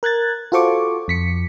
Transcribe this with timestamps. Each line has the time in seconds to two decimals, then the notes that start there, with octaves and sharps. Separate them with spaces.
0.03 A#4 F#6 G#6 A6
0.52 F4 F#4 A4 C5 C#6 D6
1.08 F2 B6 C#7